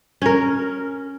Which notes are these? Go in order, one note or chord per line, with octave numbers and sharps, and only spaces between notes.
C#4 A#4